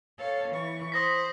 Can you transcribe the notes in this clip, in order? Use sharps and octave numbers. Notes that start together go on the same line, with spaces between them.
A4 C#5 F5
E3 C#6
C5 D#6 A#6 B6